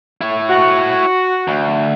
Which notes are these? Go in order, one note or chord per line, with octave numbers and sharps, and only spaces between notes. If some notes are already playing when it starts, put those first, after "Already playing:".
E4 C#5
F#4
D2